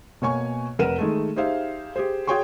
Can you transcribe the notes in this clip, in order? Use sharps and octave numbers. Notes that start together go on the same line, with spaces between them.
B2 A#3 C#5 G#5 C#6
F1 A#4 B4 F#5 D#7 E7
D#3 G#3 A3
D#4 G4 G#4 C5 E5 F5
G4 G#4 C5
F#4 G#4 C#5 G5 C6 C#6